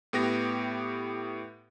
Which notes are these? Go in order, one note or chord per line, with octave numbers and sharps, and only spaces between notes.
A2 B3 G4 A#6